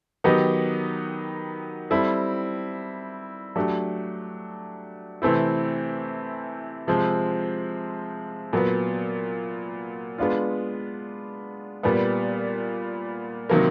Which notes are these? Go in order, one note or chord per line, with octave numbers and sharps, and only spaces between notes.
D#3 F#3 B3 D#4 G4
G3 C4 E4 A4
F#3 A3 D4 G4
C3 E3 A3 C4 E4
C3 F3 G#3 C4
A#2 F#3 B3
G#3 B3 D4 F4
A#2 G3 B3
C3 D#3 F#3 A#3